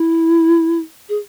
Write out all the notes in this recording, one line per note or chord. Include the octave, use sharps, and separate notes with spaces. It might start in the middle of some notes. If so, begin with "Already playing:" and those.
Already playing: E4
G#4